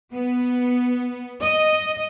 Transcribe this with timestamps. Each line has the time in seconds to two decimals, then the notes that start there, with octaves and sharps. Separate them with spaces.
0.13 B3
1.42 D#5